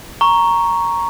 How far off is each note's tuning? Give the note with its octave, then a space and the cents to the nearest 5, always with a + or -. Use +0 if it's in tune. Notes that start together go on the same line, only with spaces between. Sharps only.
A#5 +0 C#6 +0